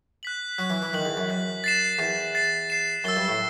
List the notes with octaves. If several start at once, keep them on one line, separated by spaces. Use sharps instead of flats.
F#6 B6 F#7
F#3 F#6 B6 F#7
E3
E3
D#3 F#6 B6 F#7
E2
F#2
F#6 B6 F#7
A6 C7 E7
E2 A6 C7 E7
A6 C7 E7
A6 C7 E7
F#2 E6 A6 E7 G7
G2
A2